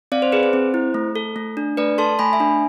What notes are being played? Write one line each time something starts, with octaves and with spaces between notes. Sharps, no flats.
C4 D5 F5
C5
G#4 B4
C5
C4
E4
A3
A4
A3
D4
A3 B4 D5
A4 A5 C6
A3 G#5 B5
E5 G#5
D4